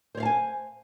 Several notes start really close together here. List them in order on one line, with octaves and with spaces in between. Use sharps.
C5 C#5 F5 A5 G#5